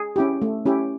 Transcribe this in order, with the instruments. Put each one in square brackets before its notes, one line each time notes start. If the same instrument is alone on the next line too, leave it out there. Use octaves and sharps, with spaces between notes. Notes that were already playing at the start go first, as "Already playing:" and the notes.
Already playing: [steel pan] G#4
C#4 E4 G4
A3
C#4 E4 G4